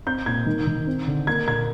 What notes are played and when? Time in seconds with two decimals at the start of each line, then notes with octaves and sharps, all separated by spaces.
0.06 C4 G6
0.26 A#2 G#6
0.46 D#3
0.67 D#3
0.87 C4
1.07 D3
1.27 A#3 G#6
1.47 A#2 G#6